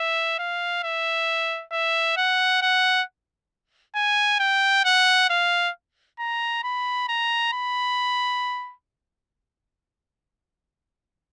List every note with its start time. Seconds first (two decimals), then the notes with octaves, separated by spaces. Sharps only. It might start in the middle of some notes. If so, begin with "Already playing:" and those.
Already playing: E5
0.39 F5
0.83 E5
1.72 E5
2.17 F#5
2.62 F#5
3.95 G#5
4.40 G5
4.85 F#5
5.30 F5
6.20 A#5
6.64 B5
7.08 A#5
7.53 B5